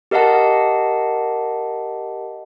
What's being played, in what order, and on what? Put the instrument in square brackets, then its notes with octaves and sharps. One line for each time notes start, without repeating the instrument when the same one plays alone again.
[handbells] G4 A#4 D#5 F5 F#5 A5